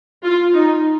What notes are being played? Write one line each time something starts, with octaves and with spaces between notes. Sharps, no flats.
F4
D#4